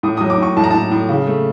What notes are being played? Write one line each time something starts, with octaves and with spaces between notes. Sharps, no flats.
A2 D#6
F#3 D#6
D6
A2 C#6
A2 A5
A#5
A2 A5
A2
C#3
A3